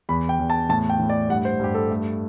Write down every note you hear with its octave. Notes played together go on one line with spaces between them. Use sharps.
E2 B5
G5
E2
A5
A2 A5
G5
A2
D5
G2 F#5
C5
G2 G4
A4
A3